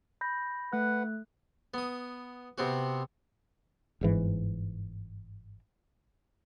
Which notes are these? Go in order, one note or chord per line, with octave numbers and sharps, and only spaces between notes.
B5 G6 A#6
A3 B4 F#5 F#6
B3 D#6
C3 B3 C4 F#4
G1 G#2 E3